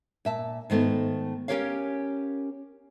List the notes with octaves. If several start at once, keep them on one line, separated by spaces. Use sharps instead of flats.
A#2 E5 A5
G#2 D#3 A3 B3
C#4 E4 G4 A#4 C#5 F5